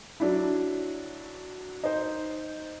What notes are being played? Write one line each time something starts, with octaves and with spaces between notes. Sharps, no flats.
F#3 D4 E4
D#4 C5